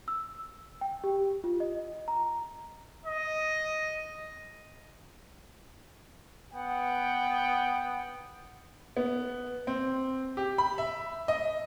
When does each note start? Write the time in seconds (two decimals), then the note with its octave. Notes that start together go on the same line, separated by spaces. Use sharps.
0.08 E6
0.81 G5
1.04 G4
1.44 F4
1.60 D#5
2.08 A#5
3.06 D#5
6.53 B3 F#5 G5
8.97 B3
9.67 C4
10.37 G4
10.58 B5
10.78 E5
11.28 D#5